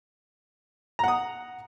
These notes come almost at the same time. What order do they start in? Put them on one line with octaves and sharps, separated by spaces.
A#5 F#5 D#6